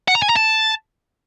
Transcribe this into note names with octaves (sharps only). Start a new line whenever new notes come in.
F#5
A#5
G#5
A#5
A5